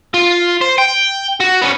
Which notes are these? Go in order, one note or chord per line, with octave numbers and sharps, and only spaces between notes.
F4
C5
G5
F#4
B3 C#4